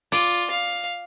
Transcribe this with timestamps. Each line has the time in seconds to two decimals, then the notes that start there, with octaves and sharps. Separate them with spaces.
0.12 F4 D5
0.51 F5